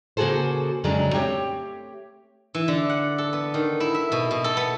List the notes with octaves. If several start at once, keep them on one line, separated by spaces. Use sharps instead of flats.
C#3 A#3 F#4 G#4 A4 C5
F2 C#3 F#3 G#3 D4 A#5
A3 C4 G4 C#5
E3
D3
F#5
A4
B3
D#3
E4
E5
B2
B2
A4
B3